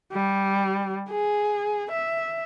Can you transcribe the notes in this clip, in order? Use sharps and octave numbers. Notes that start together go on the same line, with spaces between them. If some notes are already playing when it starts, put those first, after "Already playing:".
G3
G#4
E5